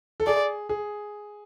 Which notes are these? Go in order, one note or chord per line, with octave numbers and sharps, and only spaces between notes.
A4
G#4 D5
G#4